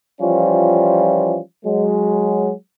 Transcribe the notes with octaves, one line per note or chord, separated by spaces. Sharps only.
E3 F3 G3 C#4 F4
F#3 G#3